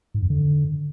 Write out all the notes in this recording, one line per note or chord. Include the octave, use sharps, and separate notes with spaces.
G#2
F2
D3